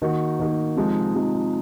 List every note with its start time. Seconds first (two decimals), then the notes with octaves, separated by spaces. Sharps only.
0.02 D#3 A#3 D#4 F#4
0.39 D#3 A#3 D#4 F#4
0.76 C3 F3 G#3 D#4
1.14 C3 F3 G#3 D#4